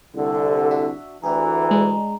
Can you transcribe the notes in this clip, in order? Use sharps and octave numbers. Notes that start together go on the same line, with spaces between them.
C2 D3 A4
D4 F#4 E5
D2 E3 G4 G#4 A#5
G#3 D4